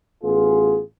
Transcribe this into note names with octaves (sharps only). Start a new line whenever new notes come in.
A1 B3 F4 G#4